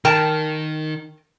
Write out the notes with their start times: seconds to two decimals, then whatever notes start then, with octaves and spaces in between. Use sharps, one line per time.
0.05 D#3 A#4 G5 A5